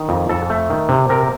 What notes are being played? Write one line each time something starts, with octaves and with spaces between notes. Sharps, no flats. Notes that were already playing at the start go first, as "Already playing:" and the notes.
Already playing: D#3
F2
F2 A4
A3
D#3
C3
C3 A#4